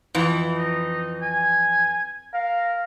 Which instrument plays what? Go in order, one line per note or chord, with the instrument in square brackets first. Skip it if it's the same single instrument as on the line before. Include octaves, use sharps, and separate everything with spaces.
[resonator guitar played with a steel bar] F2 E3
[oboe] D#4
G#5
[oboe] A#4 [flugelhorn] F5